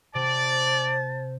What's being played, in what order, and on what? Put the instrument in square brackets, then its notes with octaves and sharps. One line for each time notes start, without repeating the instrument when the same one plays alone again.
[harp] C3 [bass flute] C5 [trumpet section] D5 [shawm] A5